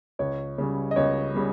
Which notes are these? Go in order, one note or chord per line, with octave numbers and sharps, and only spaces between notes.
C#2 C#5
C#3 G3
D#5
C#2 C#5
C#3 G3